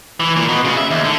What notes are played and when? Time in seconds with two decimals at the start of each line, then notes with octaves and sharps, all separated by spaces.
0.20 E3
0.36 A#2
0.49 B2
0.65 C#3
0.77 E5
0.90 D#2
1.04 D3